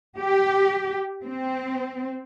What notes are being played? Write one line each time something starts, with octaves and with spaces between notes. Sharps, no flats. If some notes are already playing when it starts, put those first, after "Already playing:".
G4
C4